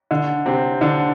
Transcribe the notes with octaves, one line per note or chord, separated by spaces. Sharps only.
D3
C3 C4
D3 D4